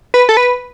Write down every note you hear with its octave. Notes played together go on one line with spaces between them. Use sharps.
B4
A4
B4